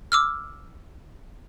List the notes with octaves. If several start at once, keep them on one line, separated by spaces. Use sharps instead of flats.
D6 E6 F6